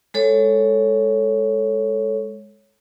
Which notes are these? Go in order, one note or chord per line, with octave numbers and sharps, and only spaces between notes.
G#3 A4 C#5